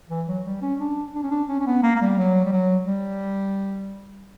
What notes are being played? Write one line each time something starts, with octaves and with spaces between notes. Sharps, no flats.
E3
F#3
G3
C#4
D4
D4
C#4
D4
C#4
C#4
B3
A#3
A#3
G3
F#3
G3
F#3
G3